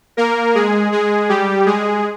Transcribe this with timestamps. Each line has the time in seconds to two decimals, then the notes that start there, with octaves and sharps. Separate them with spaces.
0.17 A#3 A#4
0.55 G#3 G#4
0.92 G#3 G#4
1.29 G3 G4
1.66 G#3 G#4